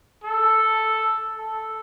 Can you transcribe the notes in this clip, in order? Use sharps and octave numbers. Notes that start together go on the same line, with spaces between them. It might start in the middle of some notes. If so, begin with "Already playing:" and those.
A4
A4